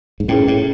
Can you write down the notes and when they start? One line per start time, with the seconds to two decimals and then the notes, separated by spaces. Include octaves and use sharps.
0.20 G#2
0.28 A2 C#4 E4 G#4 B4
0.48 A2